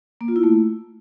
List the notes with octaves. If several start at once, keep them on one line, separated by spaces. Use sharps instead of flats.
A#3
F4
E4
A3